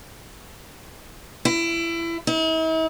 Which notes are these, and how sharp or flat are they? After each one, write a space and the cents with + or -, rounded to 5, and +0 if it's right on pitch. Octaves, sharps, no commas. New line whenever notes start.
E4 +25
E4 -45